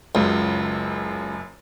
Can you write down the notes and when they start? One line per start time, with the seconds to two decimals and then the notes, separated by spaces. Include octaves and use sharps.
0.15 F#1 C#2 F#2 F4